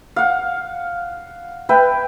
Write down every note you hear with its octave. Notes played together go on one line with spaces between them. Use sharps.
F5 F#5
B4 E5 G5